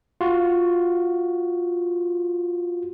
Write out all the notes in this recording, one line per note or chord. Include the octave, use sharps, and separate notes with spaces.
F4 F#4